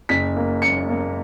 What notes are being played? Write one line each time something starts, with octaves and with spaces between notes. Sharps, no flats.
F#1 B6
A#3
F#2 C#7
A#3